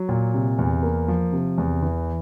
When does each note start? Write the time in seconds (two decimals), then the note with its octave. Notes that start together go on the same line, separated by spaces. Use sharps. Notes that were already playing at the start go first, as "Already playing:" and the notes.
Already playing: F#3
0.09 A#2
0.34 C3
0.58 E2
0.83 A#3
1.08 F3
1.33 C3
1.58 E2
1.82 E3